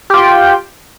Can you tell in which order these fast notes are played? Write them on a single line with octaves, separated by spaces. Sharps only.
G4 F4 G5